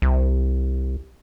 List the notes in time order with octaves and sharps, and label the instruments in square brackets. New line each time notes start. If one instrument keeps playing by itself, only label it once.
[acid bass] C2